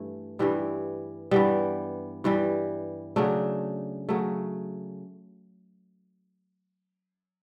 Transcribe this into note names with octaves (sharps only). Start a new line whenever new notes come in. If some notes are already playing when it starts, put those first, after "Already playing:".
Already playing: G2 E3 A3
G2 E3 G3
G2 E3 G3 B3
G2 E3 G3
C#3 F#3 A3 D4
C#3 F#3 A3